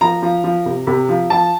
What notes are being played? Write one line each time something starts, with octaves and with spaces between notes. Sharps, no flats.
F3 A#5
F3
F3
C3
C3
F3
F3 A5